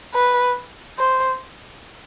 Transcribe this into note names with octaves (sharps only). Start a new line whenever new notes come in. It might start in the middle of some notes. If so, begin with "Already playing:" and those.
B4
C5